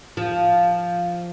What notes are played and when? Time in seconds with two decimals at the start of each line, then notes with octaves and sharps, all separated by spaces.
0.17 F3